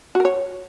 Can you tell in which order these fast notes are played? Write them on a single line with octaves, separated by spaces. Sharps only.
F#4 A#4 C#5